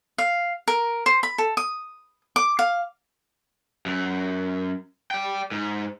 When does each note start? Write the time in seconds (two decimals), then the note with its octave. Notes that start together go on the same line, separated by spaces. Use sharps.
0.18 F5
0.68 A#4
1.06 C5
1.23 B5
1.38 A4
1.57 D#6
2.36 D6
2.59 F5
3.86 F#2
5.11 D5 G5
5.51 G#2